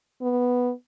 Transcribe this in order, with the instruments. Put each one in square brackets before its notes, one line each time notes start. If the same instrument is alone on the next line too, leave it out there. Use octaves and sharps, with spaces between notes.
[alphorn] B3